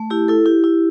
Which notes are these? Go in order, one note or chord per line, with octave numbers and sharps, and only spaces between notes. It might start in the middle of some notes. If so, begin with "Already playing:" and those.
Already playing: A3
E4 G4
E4 A4
E4 G4
E4